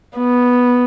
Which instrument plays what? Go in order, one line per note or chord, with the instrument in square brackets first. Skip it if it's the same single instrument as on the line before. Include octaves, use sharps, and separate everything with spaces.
[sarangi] B3